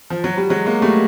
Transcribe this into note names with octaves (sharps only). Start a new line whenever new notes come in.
F3
F#3
G3
F#3 G#3
G#3 A#3
G3 A3